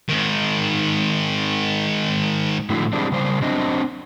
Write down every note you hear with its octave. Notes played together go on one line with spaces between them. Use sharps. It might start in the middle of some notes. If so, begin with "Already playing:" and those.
G#2 D#3
A2 D3 F3 E4 F#4
E3 G3 G#3 C4 D4
C#3 G3 C5
F#3 C4 D4 C5 D#5